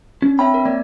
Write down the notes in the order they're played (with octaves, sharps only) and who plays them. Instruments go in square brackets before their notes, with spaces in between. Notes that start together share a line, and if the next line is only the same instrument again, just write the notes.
[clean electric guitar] C#4 [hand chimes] D4
[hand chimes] C4 C#5 E5 [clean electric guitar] G5 B5
[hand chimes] A#4
[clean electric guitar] A#3 [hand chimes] D5